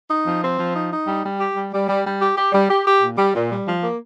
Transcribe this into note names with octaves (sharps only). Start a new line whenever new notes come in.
D#4
F3
C4
F3
D#4
D#4
G3
G3
G4
G3
G3
G3
G3
G4
G4
G3
G4
G4
A#2
G3
A#2
G3
F3
A#3